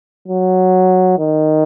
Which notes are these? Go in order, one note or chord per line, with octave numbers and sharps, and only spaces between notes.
F#3
D#3